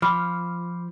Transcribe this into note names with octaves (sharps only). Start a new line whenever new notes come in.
F3 B5 D6 F6